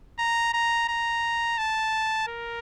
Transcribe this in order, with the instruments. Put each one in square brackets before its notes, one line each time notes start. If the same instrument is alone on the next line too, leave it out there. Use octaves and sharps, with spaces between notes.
[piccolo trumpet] A#5
A#5
A#5
A5
A#4